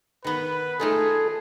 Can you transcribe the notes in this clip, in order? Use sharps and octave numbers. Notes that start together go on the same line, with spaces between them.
D#3 B3 B4
A3 D#4 F4 G#4 A4